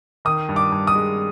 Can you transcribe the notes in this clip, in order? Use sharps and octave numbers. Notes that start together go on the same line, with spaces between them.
D#3 D#6
G2
D6
G2
D#6
G#3